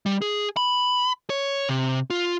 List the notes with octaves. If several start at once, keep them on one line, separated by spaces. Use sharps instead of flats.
G3
G#4
B5
C#5
C3
F4